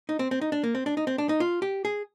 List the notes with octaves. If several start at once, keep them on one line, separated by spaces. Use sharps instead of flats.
D#4
C4
C4
D#4
D4
A#3
C4
D4
D#4
C4
D4
D#4
F4
G4
G#4